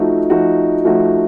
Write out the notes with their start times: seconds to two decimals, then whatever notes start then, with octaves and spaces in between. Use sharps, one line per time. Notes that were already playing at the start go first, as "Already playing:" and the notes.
Already playing: F3 A3 D#4 F#4
0.30 F3 A3 D#4 F#4
0.85 F3 A3 D#4 F#4